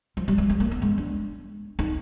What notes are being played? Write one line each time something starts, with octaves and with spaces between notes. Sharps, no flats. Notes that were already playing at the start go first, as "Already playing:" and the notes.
F3
G3
G3
G#3
A#3
B3
G#3
D4
D#4